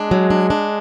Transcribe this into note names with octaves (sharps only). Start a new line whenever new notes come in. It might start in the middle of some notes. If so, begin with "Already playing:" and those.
Already playing: G#3 D4
F#3
D4
D4